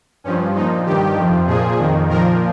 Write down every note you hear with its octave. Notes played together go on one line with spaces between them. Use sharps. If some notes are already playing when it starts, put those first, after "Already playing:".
G2 F3 C#4
A#2 F3 D#4
G2 D#3 G4
F2 C3 F3
A#2 F3 G#4
F2 D#3
A#2 F3 A#4